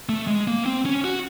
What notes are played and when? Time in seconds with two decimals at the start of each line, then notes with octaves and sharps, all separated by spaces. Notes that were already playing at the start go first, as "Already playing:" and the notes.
0.09 A3
0.27 G#3
0.48 A#3
0.66 C4
0.86 C#4
1.04 F#4